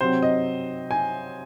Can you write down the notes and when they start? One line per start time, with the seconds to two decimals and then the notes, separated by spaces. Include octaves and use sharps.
0.01 C3 F#3 C4 C5
0.22 D#5
0.91 G#5